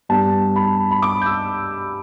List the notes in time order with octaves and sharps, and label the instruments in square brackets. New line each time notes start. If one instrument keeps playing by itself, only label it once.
[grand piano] G2 G3 B3 A5
B5
B5
D6
G6
E6